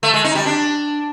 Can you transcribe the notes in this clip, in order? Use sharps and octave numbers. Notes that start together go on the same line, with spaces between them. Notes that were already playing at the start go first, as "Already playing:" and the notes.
A3
G#3
D#4
G3
D4